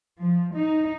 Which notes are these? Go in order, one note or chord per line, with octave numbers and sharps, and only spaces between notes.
F3
D#4